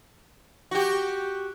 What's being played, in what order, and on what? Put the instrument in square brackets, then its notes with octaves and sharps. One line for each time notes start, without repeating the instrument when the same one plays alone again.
[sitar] F#4 G4